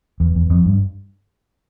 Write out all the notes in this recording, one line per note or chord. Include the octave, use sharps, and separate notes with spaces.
E2
E2
F2
G2